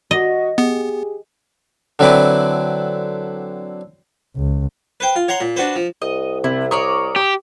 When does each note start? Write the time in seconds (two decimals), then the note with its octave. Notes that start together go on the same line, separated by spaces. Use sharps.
0.11 F#4 D#5
0.58 B3 G4 G#4
1.99 D3 F#3 C4 E4 B4 D5
4.36 C#2
5.00 B4 C5 G5
5.16 F4
5.28 C#5 F#5 A#5 C6
5.40 A#2
5.56 D4 F#4 B4 C5
5.76 F3
6.02 C2 D#5
6.44 C3 E4
6.71 A#4 C#5 D5 D#6
7.16 G4